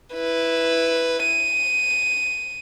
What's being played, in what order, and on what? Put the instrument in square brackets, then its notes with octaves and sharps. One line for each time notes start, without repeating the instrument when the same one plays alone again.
[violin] E4 B4
D#7